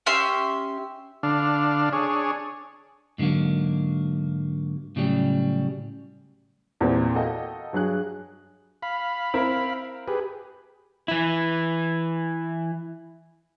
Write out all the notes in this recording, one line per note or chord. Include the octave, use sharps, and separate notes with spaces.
C#4 G4 E5 C6
D3 D4 F5
D4 G#4 C#5
G#2 D3 F3 F#3 A#3
A2 C#3 F#3 G3
E2 A#2 G3 C4 E4
F#4 A4 A#4 D#5 F5 G5
G2 F#3 G#4 F#6
F5 B5
C4 E4 A#4
G4 G#4 B4
E3 E4